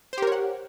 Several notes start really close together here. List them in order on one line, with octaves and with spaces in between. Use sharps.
C5 G4 A#4 C#5 F#5